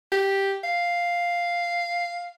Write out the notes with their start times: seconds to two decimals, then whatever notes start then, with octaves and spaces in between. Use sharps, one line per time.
0.12 G4
0.64 F5